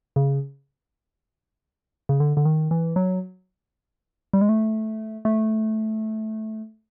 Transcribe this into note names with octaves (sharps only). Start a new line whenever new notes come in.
C#3
C#3
D3
D3
D#3
E3
F#3
G3
G#3
A3
A3